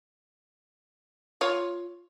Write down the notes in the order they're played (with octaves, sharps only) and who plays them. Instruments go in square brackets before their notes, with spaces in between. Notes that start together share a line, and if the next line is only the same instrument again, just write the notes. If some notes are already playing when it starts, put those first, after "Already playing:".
[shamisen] F4 C#5